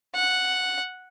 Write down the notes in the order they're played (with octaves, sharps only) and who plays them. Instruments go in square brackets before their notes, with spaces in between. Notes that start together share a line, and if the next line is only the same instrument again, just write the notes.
[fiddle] F#5